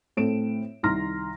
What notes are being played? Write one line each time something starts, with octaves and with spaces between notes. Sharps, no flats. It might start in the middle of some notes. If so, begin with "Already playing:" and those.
A2 C4 A4 D7 E7
C2 D#3 A#5 C6 F6 A#6